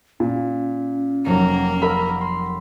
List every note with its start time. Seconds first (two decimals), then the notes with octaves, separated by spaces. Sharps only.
0.20 A#2 C#4
1.26 F1 F#3 A#3
1.82 A#4 B5 E6
2.21 B5 C6